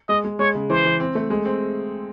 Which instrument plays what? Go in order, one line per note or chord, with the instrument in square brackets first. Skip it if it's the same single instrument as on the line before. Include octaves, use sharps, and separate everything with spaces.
[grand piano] G#3 [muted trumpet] D#5
[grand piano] G#3
[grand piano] G#3 [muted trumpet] C#5
[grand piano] C#3
[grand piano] E3 [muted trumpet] C5
[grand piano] E3
C4
A3
G#3
C4